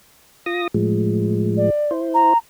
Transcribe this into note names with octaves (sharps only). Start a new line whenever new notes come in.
F4 D#6 A#6
A2 F3 G#3
D5
E4 C5
A#5